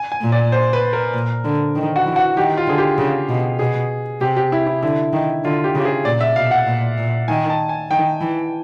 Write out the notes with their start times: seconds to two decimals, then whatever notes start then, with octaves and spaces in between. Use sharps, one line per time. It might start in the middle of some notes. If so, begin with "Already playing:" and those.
Already playing: G#5
0.12 G#5
0.22 A#2
0.32 D5
0.52 C5
0.73 B4
0.93 A#4
1.14 A#2
1.44 D3
1.76 D#3
1.96 F#4
2.06 E3
2.16 F#4
2.36 D#3 G4
2.57 F4
2.67 D3 G#4
2.78 G4
2.98 C#3
3.29 B2
3.59 B2 G#4
4.21 C3 G4
4.37 G4
4.52 E4
4.67 E4
4.83 D3 E4
5.13 D#3
5.44 D3 F4
5.64 G4
5.75 C#3
5.79 G4
5.85 G#4
6.05 A#2 D5
6.21 E5
6.36 B2 F5
6.51 F#5
6.67 A#2
6.98 A#2
7.28 D#3 G#5
7.50 A5
7.69 G#5
7.91 D#3 G5
8.21 E3